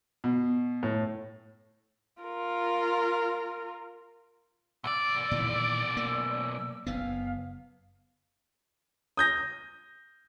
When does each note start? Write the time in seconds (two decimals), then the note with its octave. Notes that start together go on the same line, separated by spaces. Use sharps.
0.24 B2
0.83 A2
2.23 F4 A#4
4.84 B1 D5 E6
5.31 A#2 D#3 E3
5.97 A#3 E6
6.87 F#1 B3 F5
9.17 D#6 G6 A#6